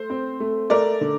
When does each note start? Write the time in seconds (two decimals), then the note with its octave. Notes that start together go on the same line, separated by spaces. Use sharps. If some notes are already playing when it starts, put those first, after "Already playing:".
Already playing: A3 C5
0.10 C4
0.40 A3
0.70 A3 A#4 D5
1.01 D3